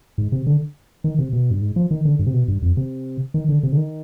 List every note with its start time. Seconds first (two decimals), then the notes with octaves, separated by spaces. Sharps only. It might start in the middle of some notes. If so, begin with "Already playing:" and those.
0.18 G#2
0.32 C3
0.47 D3
1.04 D#3
1.19 C3
1.33 B2
1.51 G2
1.61 G#2
1.76 F3
1.91 D#3
2.05 D3
2.19 G2
2.27 C3
2.34 B2
2.48 G2
2.62 F2
2.77 C3
3.34 D#3
3.49 D3
3.63 C3
3.72 D3
3.77 D#3